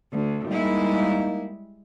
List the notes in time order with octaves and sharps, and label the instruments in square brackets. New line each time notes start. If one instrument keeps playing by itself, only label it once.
[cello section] D2
[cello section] G3 G#3 E4 [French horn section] A#3 D#4